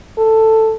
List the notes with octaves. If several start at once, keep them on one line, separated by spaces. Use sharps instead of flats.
A4